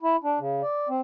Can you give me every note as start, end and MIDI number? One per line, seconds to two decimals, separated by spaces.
0.02 0.16 64
0.24 0.39 62
0.39 0.62 49
0.62 0.88 74
0.89 1.01 60